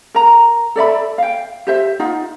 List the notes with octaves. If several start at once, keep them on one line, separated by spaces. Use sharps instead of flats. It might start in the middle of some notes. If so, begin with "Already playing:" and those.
A#4 A#5
A4 D5 E5 B5
F5 G5
G4 C5 E5
D#4 F4 F#5